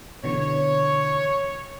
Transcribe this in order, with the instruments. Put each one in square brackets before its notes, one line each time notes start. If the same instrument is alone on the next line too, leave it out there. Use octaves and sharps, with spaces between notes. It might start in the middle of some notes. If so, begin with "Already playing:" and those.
[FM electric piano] B2 D3 E3 [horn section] C#5